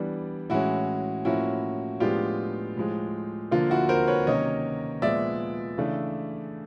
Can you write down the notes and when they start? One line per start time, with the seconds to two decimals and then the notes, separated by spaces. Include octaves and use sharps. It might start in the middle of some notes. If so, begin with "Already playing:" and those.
Already playing: E3 G3 B3 D4
0.50 A2 E3 G#3 C#4 E4 F#4
1.25 A2 F3 A#3 C#4 E4 F#4
2.00 A2 F3 G#3 B3 D4 F4 G4
2.76 A2 F3 G#3
3.51 D3 F3 A#3 F4
3.70 E4 F#4
3.89 A#4 C5
4.07 B4 C#5
4.27 C3 D#3 F#3 A#3 C#4 C#5 D#5
5.02 A#2 F3 G#3 B3 D5 E5
5.78 C#3 E3 A3 D4